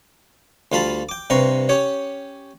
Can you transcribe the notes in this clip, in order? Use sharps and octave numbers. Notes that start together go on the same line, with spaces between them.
D2 G3 F4 F5 A5 B5
G5 D6
G2 C3 B4 A#5 C6 C#6
C#4 G4 C#5